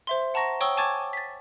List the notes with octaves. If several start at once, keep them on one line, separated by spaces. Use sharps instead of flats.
C5 E5 C6
F#5 A5 A#5 C#6 A#6
C#5 G5 C#6 D#6 E6 G7
G#5 A5 C#6 D6 G#6 A6
A6 B6